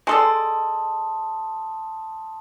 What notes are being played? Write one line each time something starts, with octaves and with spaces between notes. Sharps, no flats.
G#3 A4 D5 A5 C6 D#6